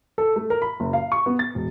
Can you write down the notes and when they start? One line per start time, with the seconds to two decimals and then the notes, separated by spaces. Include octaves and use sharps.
0.18 A4
0.36 A3
0.50 A#4
0.62 B5
0.80 F#1
0.93 F5
1.12 C#6
1.26 B3
1.39 A6
1.55 E1